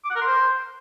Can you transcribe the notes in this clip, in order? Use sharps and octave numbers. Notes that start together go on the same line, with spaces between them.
D6
F#5
A#4
C6
C5